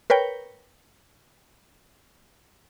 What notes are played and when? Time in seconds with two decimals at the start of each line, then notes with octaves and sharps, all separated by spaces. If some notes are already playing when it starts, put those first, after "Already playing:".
0.10 A#4 B4 C#5 G5